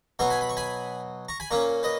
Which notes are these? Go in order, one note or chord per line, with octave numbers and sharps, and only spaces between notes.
B2 F#3 B3 A#5 C#6
G#5 B5
B5
C#6
G#5 B5
A#5 C#6
G#5 B5
A#2 A#3 C#4 A#5 C#6
B4 D#5